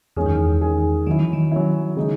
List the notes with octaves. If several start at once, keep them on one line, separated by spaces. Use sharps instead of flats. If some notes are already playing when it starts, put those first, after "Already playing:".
E2 D#3 G#3 C#4 G#4
F#2
E2
D#3 G#3 C#4 G#4
D#3 F#3 C#4 E4
E3
D#3
F#3 C#4 E4
C#3 G#3 D#4